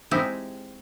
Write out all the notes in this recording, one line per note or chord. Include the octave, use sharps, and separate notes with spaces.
G#3 C4 D#4 E4 G4 G#4